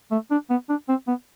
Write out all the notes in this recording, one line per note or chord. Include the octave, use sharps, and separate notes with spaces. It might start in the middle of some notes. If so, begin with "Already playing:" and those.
A3
D4
B3
D4
C4
B3